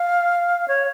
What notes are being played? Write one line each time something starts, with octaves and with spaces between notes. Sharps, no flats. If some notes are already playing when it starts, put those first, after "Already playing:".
Already playing: F5
C#5